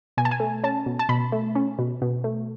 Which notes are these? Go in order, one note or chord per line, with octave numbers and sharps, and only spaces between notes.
B2 G#5
A5
G#5
A3
C#4 A5
B2
A5
B2 B5
A3
C#4
B2
B2
A3